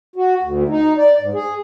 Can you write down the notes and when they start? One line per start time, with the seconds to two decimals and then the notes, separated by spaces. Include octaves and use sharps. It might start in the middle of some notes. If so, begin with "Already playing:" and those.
0.16 F#4
0.42 D2
0.69 D#4
0.97 D5
1.19 G#2
1.34 G#4